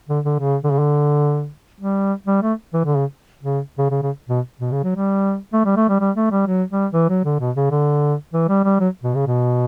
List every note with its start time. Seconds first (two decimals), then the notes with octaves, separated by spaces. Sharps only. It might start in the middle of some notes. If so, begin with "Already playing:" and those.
0.09 D3
0.25 D3
0.40 C#3
0.64 D3
0.72 C#3
0.79 D3
1.80 G3
2.27 G3
2.42 A3
2.74 E3
2.85 D3
2.97 C#3
3.43 C#3
3.78 C#3
3.91 C#3
4.02 C#3
4.29 B2
4.60 B2
4.72 C#3
4.83 F#3
4.96 G3
5.53 A3
5.65 G3
5.77 A3
5.89 G3
6.00 G3
6.16 A3
6.31 G3
6.47 F#3
6.70 G3
6.93 E3
7.09 F#3
7.25 D3
7.40 B2
7.56 C#3
7.71 D3
8.33 E3
8.49 G3
8.64 G3
8.80 F#3
9.04 B2
9.15 C#3
9.27 B2